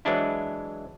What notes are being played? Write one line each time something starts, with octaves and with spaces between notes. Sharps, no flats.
E3 F#3 G#3 D4 E4